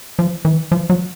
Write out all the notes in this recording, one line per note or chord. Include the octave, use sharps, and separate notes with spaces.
F3
E3
F3
F#3